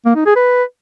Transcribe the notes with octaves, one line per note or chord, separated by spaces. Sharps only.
A#3
D#4
G#4
B4